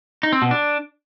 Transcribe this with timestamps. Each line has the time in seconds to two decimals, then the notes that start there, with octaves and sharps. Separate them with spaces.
0.23 D#4
0.33 C4
0.42 B2
0.51 D4